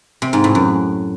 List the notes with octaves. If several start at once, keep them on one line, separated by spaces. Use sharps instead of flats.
C3
G#2
A2
F#2